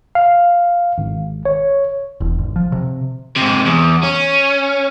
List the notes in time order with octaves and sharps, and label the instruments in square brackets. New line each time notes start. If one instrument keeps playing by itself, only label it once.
[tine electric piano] F5
G#1
C#5
[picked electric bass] E1
G#1
F3
C3
[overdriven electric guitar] G#2 C3
E2
C#4